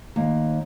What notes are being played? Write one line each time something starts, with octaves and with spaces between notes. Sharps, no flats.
D#2